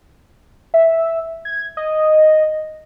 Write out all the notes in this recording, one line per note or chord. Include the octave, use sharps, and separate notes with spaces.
E5
G#6
D#5